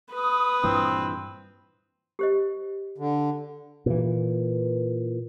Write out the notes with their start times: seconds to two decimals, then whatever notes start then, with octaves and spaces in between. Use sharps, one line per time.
0.12 B4 D#6
0.64 G2 A#2 E3 C4
2.19 G4 C5 D#5
2.98 D3
3.86 A#2 E3